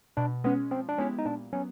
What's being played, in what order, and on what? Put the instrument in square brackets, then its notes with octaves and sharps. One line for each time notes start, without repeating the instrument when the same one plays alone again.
[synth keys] B2 [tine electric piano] D4
[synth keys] G#3 C#4 [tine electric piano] B3
[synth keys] F3 [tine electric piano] C4
[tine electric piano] D4
[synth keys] G#3 B3 E4 G4 [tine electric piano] C#4
[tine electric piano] D#4
[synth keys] A#2 [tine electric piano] D4
[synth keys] F#3 B3 [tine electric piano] C#4